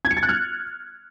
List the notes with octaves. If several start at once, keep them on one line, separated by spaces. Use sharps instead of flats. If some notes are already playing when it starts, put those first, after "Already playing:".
G#6
C#7
A6
F#6
F6